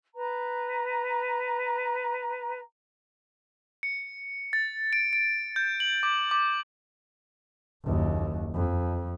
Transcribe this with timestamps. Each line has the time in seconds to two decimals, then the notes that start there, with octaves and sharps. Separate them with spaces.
0.14 B4 A#5
3.83 C#7
4.53 A6
4.93 D7
5.13 D7
5.56 G6
5.80 F#7
6.03 D6
6.31 D6
7.84 F#1 D#2
8.54 F2